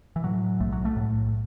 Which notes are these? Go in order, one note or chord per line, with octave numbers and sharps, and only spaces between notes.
E3
A2 F#3
B1 A3
F#3
A3
A2